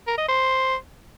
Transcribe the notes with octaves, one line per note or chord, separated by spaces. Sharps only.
A#4
D#5
C5